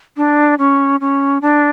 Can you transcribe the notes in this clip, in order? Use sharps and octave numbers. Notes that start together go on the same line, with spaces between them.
D4
C#4
C#4
D4